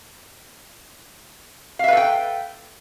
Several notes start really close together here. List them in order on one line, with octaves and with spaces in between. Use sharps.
F5 E5 B4 A4 G5